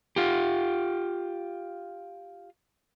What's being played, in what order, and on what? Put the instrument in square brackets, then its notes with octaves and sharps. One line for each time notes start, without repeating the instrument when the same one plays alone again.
[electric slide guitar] F4 G4